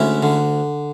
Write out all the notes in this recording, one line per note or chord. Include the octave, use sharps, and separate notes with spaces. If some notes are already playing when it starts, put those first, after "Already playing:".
Already playing: D2 G#3 C#4 E4
D3